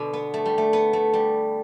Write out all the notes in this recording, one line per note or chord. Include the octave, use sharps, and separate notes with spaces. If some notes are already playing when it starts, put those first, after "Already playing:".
Already playing: B2 D3
B3
A3
G3
A3
B3
A3
G3